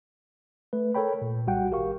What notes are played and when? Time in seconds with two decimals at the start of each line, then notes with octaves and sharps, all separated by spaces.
0.73 A3 B4
0.95 A4 A#4 C#5 G5 B5
1.22 A#2
1.47 B1 G3 F#4 F#5 G5
1.71 G#1 G4 A#4 F5 C#6